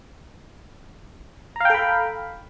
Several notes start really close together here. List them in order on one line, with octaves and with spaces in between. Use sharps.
A#5 F5 G5 A4 B5